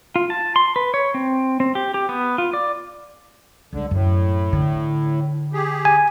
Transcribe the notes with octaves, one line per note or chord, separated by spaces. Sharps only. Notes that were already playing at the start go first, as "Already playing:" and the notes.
F4
A5
C6
B4
C#5
C4
C4
G4
G4
B3
F4
D5
C#2 D3 G3
F#2 A2
D3
G4 G#4
G#5